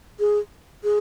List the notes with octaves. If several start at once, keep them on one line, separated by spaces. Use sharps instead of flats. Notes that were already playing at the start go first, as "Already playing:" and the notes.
G#4
G#4